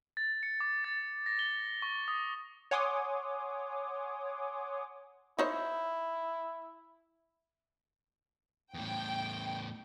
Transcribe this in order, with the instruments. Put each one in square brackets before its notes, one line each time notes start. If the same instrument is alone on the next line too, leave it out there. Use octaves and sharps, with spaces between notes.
[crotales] A6
C#7
D6
A6
A#6
G7
C#6
D#6
[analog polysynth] C#5 F#5 G#5 C6 D6 D#6
[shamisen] D#4 C5 C#5 [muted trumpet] E4
[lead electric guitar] E2 A2 [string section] G5